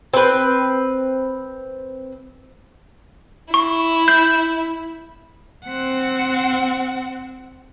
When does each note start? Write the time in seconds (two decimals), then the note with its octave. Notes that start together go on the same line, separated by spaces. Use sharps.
0.14 C4 B4
3.54 E4 C#6
4.08 G6
5.66 C4 F#5